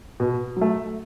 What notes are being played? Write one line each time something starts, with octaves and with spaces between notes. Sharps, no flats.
B2
F#3 A3